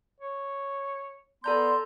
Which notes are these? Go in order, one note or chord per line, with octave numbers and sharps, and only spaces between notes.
C#5
B3 A4 D5 A5 A#5 C6 G6